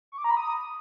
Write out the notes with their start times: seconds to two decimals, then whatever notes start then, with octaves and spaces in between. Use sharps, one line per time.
0.12 C#6
0.18 D6
0.24 A#5
0.31 B5
0.37 D#6